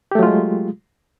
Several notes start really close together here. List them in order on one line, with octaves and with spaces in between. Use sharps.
G4 A3 F#3 F4 G#3